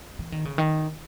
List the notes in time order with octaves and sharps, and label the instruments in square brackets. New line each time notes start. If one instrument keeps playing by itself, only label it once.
[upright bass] E3
D#3
C#3
D#3